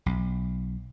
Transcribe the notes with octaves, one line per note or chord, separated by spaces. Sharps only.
B1